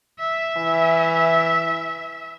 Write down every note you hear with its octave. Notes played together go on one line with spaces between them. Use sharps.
E5
E3